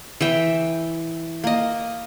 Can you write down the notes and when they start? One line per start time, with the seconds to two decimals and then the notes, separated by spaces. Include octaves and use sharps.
0.21 E3 E5 G5
1.44 A#3 D#5